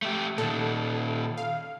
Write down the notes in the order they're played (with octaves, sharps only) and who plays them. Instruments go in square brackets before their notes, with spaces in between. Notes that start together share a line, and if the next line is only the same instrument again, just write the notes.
[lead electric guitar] A3 G4
[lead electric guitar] A#2 D#3 [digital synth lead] A4
[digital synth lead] F5